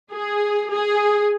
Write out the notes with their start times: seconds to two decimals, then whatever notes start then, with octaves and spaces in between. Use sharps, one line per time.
0.12 G#4
0.71 G#4